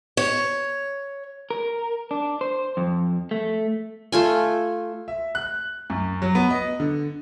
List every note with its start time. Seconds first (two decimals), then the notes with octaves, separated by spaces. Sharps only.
0.17 C#5
1.50 A#4
2.11 D4
2.41 C5
2.77 F2
3.31 A3
4.12 A3 F4 G#5
5.08 E5
5.35 F#6
5.90 F#2
6.22 F#3
6.35 B3
6.50 D#5
6.80 D3